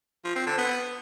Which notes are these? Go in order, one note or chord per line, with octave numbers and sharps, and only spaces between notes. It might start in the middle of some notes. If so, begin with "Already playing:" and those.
F3
C4
D3
B3